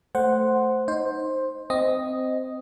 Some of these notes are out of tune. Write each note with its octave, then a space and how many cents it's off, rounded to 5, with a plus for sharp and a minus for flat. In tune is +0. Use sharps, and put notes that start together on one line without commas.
A3 +0 C5 +0 F#5 +0
D#4 +0 C5 +10
C4 -10 D#5 +0